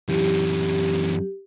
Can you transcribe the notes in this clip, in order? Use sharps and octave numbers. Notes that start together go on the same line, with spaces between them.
F#2 E3 G4